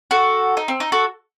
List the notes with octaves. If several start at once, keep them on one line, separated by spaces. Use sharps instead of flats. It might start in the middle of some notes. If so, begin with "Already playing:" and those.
F#4 A4
D#4
C4
D#4
F#4 A4